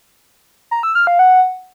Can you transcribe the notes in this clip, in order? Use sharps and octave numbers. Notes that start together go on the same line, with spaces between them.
A#5
E6
F6
F5
F#5